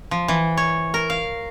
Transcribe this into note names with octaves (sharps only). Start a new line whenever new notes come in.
F3
E3
C#5
A#4
F5